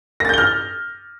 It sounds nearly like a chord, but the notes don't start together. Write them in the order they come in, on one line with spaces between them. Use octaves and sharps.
A#6 A6 G6 G7 F6